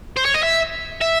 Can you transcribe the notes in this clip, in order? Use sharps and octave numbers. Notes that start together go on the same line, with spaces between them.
C5
C#5
D#5
E5
E5